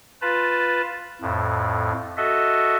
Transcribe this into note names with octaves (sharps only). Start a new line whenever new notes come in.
F4 B4 A5
F2 A2
F#4 A4 D#5 E5